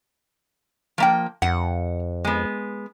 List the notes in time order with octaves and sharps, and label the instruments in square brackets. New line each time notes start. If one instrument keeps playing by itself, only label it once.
[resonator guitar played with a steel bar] F3 A#3 G5
[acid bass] F2 [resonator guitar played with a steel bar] F#5
[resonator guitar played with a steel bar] G#3 B3